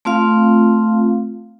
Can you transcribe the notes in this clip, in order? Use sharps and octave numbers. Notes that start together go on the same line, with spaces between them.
A3 C4 F4 F5